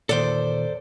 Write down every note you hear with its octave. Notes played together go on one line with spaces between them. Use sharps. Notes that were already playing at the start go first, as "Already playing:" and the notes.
E2 G2 A#2 D#3 A4 C5 D5